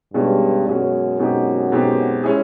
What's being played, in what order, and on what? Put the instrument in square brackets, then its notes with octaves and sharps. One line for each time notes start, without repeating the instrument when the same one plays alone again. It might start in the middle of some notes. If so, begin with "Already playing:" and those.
[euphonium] G2 [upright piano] B2 G#3 C#4
[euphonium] F#2 [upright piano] B2 G#3 C#4
[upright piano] B2 G#3 C4 D#4 G4
B2 G#3 C4 D#4 G4
G#3 C#4 E4 G#4